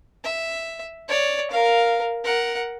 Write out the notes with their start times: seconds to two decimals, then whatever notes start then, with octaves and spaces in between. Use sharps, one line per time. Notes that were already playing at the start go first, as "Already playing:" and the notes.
0.24 E5
1.09 C#5 D5
1.51 A#4 F5
2.24 A#4 F#5